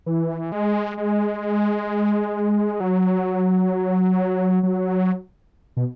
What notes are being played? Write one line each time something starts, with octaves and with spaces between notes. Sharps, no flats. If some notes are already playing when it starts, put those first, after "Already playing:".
E3
G#3
G#3
F#3
F#3
B2